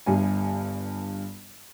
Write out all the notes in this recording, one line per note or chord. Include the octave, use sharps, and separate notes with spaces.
G1 G2 G#5